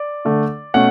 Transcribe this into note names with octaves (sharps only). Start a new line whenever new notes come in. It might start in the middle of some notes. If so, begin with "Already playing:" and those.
Already playing: D5
D3 A3 D4
B2 A3 C#4 F#5